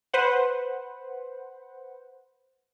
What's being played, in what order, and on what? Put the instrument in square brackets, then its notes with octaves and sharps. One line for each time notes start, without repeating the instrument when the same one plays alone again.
[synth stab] B4 C5 F#5